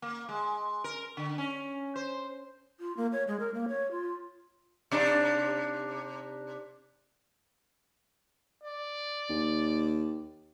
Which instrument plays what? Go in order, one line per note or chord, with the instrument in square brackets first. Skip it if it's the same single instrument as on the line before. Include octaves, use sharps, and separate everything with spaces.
[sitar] A#3
G#3
A#4
D3
C#4
C5
[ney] F4
A#3
C#5
G#3
A#4
A#3
C#5
F4
[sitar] C3 D4 D#4
[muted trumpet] D5
[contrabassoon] D#2